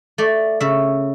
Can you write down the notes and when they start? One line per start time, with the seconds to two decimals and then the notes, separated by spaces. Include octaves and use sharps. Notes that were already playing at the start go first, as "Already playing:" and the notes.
0.18 A3 D5
0.60 C#3 E5